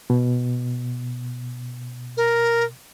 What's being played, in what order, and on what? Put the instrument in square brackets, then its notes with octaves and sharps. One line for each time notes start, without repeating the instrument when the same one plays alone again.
[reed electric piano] B2
[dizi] A#4